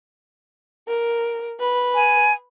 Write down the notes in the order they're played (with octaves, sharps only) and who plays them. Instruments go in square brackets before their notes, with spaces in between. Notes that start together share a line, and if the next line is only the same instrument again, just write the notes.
[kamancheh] A#4
B4
[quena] G#5